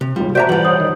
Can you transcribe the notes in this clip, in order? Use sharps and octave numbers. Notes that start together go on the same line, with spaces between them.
C3
D#2 G3 G#3 F4
B1 F#4 C5 D5 E5 A5 A#5 G6
A#2 E3 G3 B4 F#5 A5
C5 C#5 D#6 G6
D#3